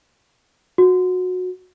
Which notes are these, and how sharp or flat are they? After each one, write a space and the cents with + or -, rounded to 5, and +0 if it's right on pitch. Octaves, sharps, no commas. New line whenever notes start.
F#4 -20